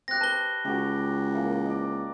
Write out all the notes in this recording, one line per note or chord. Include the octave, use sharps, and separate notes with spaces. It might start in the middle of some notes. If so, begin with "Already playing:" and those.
C4 G4 F#6 A#6
B4 C#5 A5 G7
C#2 F#4 G4
E3 A#3
D5 D#5